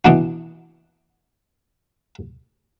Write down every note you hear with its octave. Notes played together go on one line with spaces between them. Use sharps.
B2 E3 D4 F#4